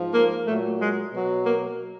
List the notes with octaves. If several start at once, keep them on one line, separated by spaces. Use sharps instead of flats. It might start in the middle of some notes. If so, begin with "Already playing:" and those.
Already playing: G#2 F3
A#3
A#2 F#3 A3
G#3
B2 F#3
A#3